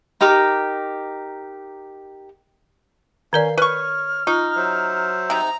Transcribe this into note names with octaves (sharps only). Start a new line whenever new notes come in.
D#4 G4 A#4 D6
D#3 C#4 A#4 D5 F5
B4 C#5 C#6 F6
D#4 F4
F#3 C5 E5
C3 D#4 A#5